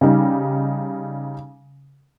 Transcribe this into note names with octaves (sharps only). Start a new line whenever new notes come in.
C#3 G3 D#4